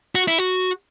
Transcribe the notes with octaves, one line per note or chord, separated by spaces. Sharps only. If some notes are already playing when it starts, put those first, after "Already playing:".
F#4
E4
F#4